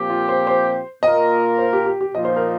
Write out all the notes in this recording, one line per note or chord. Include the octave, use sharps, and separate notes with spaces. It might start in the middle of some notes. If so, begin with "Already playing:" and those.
Already playing: A#2 F3 C4 G4
F4
C5
C5
A#2 A#3 F4 A#4 D#5
C5
G4
G4
G4
A#2 F3 D#4 D#5
C5
A#4